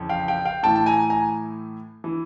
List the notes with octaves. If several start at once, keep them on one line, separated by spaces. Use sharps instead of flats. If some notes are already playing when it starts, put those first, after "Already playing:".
Already playing: F2 C#3 E3
F5 G5
F5 G5
F5 G5
A2 E3 G5 A5
A5
G#5 A#5
G#5 A#5
E3